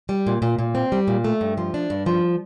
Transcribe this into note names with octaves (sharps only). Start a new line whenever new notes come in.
G3
A#2
A#2
A#2
C4
G3
A#2
A3
G2
F3
D4
G2
F3